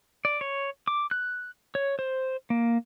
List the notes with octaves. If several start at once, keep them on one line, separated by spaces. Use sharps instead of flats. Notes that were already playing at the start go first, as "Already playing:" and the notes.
D5
C#5
D6
F#6
C#5
C5
A#3